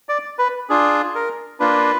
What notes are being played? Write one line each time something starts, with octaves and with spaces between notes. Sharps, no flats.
D5
B4
D4 F4 G#4
A#4
A#3 D4 F4 B4